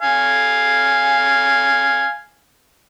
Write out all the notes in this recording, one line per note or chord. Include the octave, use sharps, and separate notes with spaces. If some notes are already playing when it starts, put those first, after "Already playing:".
F5 G#5